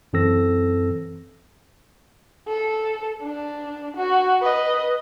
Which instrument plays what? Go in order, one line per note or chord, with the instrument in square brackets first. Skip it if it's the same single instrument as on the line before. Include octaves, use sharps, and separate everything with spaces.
[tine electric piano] F#2 E3 C4 A4 E6 A#6
[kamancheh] A4
D4
F#4
B4 D#5